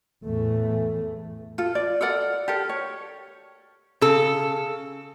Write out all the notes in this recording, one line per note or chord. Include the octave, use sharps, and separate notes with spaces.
E2 A2 E3 A3
F4 A4
D5
A4 A#4 D5 F#5
G4 A4 A#4
C#5
C#3 A4